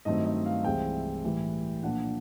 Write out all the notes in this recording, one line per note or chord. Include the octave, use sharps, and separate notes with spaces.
G2 D#3 F#3 A3 C4 D#5
D#5
F5
C2 C3 E3 G#3 C4 G5
A2 E3 G3
A#2 F3 A#3 D4 F#5